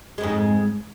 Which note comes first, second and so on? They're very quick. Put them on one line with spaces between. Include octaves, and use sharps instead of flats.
G#3 F2 G#2